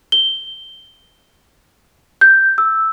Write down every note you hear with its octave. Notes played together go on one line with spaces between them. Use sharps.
G7
G6
E6